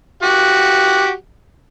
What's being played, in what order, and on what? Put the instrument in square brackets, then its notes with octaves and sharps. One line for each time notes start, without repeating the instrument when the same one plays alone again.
[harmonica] F#4 G4 F#5